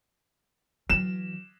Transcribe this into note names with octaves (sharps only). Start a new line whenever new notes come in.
E3 F#3 E7